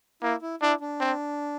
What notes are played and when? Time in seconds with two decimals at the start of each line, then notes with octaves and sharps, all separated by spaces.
0.22 A#3 E4
0.42 E4
0.61 D4 E4
0.81 D4
1.00 C4